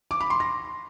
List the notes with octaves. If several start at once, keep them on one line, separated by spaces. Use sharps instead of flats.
D6
B5
C6
A#6